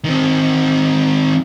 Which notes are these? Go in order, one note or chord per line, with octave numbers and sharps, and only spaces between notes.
D#3 C4